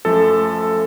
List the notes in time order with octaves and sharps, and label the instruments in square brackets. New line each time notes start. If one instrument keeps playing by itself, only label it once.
[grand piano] F#2 F3 A3 [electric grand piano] A4